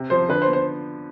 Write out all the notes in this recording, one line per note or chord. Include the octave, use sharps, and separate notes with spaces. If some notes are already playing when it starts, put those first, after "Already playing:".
Already playing: C3
F3 C5
D3 B4
C5
B3
C5